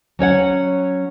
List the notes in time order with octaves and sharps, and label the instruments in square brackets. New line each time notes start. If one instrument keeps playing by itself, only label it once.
[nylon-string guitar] F#3 C#4 C#5 F#5